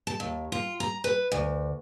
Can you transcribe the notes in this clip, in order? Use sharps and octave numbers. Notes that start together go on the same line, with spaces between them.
A5
D#2
F4
A#5
B4
D2